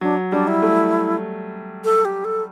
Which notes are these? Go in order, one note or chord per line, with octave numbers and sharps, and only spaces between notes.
F#3 D4
G3 D4
E4
A3
A4
G4
A4